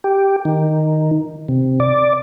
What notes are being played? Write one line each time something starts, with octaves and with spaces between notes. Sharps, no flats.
G4
D#3
C3
D5